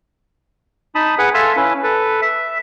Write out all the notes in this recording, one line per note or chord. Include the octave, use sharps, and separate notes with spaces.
D#4 A5 B5 D#6
G#4 B4 F#5
A4 E5 F5 G#5 A5 C6
C#4 E4 B4
A4 B4
E5